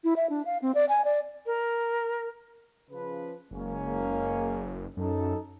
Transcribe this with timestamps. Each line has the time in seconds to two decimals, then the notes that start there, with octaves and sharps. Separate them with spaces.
0.04 E4
0.16 E5
0.30 D4
0.46 F5
0.62 C4
0.75 D5
0.89 G#5
1.05 D5
1.46 A#4
2.90 C#3 F3 B4
3.51 F#1 G#3 A#3 C#4
4.97 F#2 C#4 D#4 A4